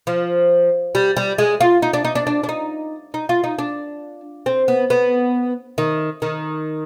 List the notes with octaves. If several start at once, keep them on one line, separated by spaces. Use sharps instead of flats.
F3
G3
G3
G#3
F4
D#4
D4
D#4
D4
D4
D4
D#4
D#4
F4
D#4
D4
C4
B3
B3
D#3
D#3